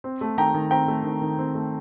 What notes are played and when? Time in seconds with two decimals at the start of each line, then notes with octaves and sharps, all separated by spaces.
0.04 C4
0.21 A3
0.38 D#3 G5 A#5
0.54 D#3
0.71 C4 G5 A#5
0.88 A3
1.04 D#3
1.22 D#3
1.38 C4
1.55 A3